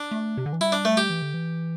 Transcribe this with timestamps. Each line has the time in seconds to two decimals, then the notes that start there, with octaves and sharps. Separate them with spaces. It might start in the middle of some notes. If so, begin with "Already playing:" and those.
Already playing: D4
0.11 A3
0.37 C3
0.46 D3
0.53 E3
0.60 G3 E4
0.72 D4
0.85 A3
0.97 G4
1.10 E3
1.22 D3
1.34 E3